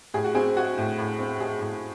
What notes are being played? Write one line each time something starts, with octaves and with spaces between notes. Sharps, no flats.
A2 G#4
F#4
C4 G#4
G#3 F#4
A2
A2
C4
G#3 G#4
A2